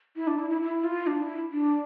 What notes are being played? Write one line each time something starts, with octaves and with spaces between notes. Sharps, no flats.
E4
D4
E4
E4
E4
F4
D4
E4
D4